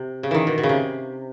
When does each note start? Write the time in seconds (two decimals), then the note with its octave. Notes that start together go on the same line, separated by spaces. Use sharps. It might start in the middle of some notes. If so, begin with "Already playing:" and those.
Already playing: C3
0.23 C#3
0.31 D#3 E3
0.47 B2
0.58 B2
0.63 C#3
0.69 C3